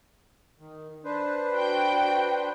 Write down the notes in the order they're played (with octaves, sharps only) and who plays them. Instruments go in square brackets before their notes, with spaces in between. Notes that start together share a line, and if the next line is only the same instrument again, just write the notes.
[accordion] D#3
D4 B4 C5
[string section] F#4 G5